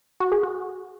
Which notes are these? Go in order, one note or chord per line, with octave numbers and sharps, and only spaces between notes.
F#4
G#4
F#4